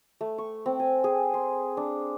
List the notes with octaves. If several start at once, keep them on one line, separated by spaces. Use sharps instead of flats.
A3
C#6
C4
G#5
G#4
C6
D4